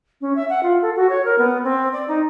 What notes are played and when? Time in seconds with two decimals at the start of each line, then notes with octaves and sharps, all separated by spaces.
0.21 C#4
0.36 E5
0.50 F#5
0.63 F4
0.82 A4
0.96 F#4
1.09 C#5
1.25 A#4
1.38 B3
1.64 C4
1.93 D5
2.08 D#4